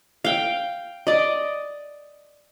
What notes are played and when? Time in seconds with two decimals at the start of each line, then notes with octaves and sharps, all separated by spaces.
0.24 F5 G5
1.07 D5 D#5